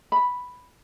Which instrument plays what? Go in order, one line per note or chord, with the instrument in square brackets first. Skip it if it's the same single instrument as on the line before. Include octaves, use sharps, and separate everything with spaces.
[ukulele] B5